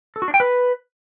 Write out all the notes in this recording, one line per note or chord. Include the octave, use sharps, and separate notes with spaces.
A4
F#4
D4
G5
B4